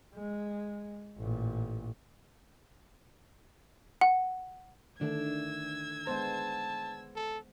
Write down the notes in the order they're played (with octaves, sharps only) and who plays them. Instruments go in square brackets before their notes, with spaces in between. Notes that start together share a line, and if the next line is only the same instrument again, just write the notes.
[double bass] G#3
A1 A#2
[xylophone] F#5
[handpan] D3 D#3 A3 [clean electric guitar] D4 [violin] E6 G#6
[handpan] G#3 B3 C5 [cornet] A5
[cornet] A4